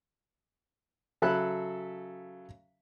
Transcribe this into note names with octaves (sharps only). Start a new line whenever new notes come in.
C#3 F#3 A4 E5 B5 F#6